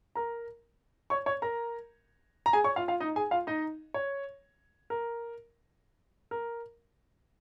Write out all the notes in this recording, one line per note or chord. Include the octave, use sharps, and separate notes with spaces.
A#4 A#5
C#5 C#6
C#5 C#6
A#4 A#5
A#5
G#4 G#5
C#5 C#6
F4 F5
F4 F5
D#4 D#5
G#4 G#5
F4 F5
D#4 D#5
C#5
A#4
A#4